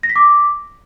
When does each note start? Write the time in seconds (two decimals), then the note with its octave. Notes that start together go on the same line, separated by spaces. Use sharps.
0.03 A#6
0.10 B6
0.16 D6